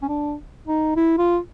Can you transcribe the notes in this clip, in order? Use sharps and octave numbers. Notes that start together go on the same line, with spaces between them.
C#4
D4
D#4
E4
F4